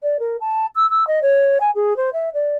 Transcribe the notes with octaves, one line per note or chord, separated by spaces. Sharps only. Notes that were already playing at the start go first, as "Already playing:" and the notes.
D5
A#4
A5
E6
E6
D#5
C#5
G#5
G#4
C5
E5
D5